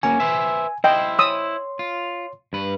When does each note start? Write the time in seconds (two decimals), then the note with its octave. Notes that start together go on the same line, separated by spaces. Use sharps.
0.03 A#3 C#4 F#4 G#5
0.20 B4 C5 E5
0.84 E4 C5 D#5 G5
1.19 C#5 C6 D#6 E6
1.79 F4
2.53 G2 B4